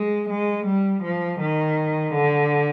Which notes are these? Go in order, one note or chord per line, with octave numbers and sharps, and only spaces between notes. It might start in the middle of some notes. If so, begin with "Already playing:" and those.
Already playing: G#3
G#3
G3
F3
D#3
D3